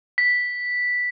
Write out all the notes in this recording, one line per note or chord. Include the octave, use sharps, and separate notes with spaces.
B6